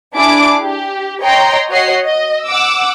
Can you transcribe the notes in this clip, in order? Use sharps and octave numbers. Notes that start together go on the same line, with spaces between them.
D4 E4 G#4 D6 D7
G4
C#5 D#5 G5 A#5 C6
F#4 C#5 D#5 F#5 C7
D#5
F#5 D6 E6